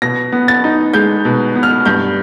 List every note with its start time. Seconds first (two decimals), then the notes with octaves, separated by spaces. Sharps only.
0.02 B2 A#6
0.32 B3
0.48 A6
0.64 D#4
0.93 G#3 G6
1.25 B2
1.55 B3
1.63 F6
1.85 G2 G6